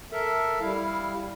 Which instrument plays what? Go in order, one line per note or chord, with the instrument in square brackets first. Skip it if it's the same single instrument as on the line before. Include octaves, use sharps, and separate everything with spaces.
[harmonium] A4 A#4 E5
G3 E4 F5